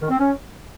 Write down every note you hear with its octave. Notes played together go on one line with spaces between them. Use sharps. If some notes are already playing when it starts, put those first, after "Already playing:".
D#3
C4
C#4